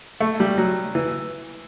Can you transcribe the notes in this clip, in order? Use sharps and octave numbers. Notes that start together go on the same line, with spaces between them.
A3
G3
F#3
E3